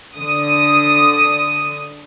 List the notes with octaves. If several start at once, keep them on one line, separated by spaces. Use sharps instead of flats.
D3 D#6